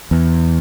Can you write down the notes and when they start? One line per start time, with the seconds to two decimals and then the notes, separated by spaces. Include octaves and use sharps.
0.11 E2